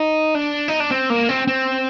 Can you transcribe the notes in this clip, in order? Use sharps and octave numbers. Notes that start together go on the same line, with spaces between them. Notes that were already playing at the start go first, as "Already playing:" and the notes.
Already playing: D#4
D4
D#4
D4
C4
A#3
C4
C4